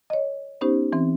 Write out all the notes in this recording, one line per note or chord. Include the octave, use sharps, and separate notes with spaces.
C#5 D#5
B3 C#4 D#4 G4 C5
E3 C4